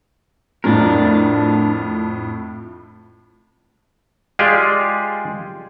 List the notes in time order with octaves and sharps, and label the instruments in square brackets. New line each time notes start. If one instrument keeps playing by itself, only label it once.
[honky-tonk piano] F2 A2 F3 [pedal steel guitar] D4 A#4
[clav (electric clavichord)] G#3 F4 G4 G#4 D5